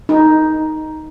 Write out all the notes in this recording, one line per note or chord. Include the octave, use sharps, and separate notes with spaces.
D#4